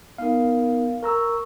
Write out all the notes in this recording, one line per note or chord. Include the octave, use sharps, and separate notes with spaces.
B3 D#4 A#4 F5
A#4 A#5 C#6 E6